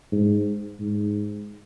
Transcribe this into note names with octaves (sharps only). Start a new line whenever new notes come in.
G#2
G#2